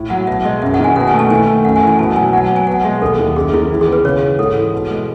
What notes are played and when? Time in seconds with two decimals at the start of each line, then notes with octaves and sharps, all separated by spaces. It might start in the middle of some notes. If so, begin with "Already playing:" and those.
Already playing: A2
0.10 F#3 F#5
0.27 B2 E5
0.45 G#3 D#5
0.62 F#2 E5
0.74 F#5
0.79 D#3
0.84 G#5
0.96 B2 F#5
1.07 G#5
1.14 A3
1.19 A5
1.30 D#3 G#5
1.47 A3
1.65 F#2 F#5
1.76 G#5
1.82 E3
1.87 G#5
1.99 B2 A5
2.16 F#3 G#5
2.33 F#3 F#5
2.44 A5
2.50 B3
2.56 G#5
2.67 B2 F#5
2.84 G#3 E5
3.01 D#2 A4
3.19 D#3
3.36 F#2 G#4
3.53 D#3 E4
3.70 E3
3.81 G#4
3.87 B3
3.93 B4
4.04 C#3 C#5
4.21 E3
4.39 G#2 A4
4.55 E3
4.73 B2
4.90 G#3